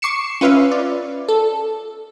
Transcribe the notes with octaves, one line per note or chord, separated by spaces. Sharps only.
C#6 D6 C7 C#7 E7
C#4 F4 B4 E5 F5
D5
A4